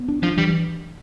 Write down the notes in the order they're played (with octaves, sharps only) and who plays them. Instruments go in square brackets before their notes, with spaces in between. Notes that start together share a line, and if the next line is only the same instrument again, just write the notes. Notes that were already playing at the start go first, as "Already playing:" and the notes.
Already playing: [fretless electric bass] B3
D4
[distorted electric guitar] F3 [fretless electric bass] D4
[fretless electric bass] E3 [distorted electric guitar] G3